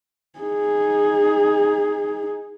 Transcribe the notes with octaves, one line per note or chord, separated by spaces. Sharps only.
D#4 G#4